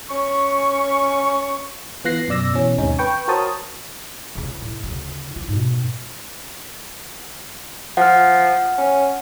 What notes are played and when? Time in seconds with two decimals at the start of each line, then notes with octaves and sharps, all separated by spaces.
0.10 C#4 C#6
2.04 E3 B3 F4 F#6 A#6 C7
2.28 F#2 B2 D5 E6 A#6
2.54 B2 E3 C#4
2.78 D#2 G#2 C3 C#4 D#4
2.99 B4 G5 C#6
3.28 F#4 A#4 C5 C#5 A5 D#6
4.35 C#2 C#3
4.62 A2
4.83 D2 C#3
5.36 F4
5.48 G#2 B2
7.97 F3 F#5 F6
8.78 C#4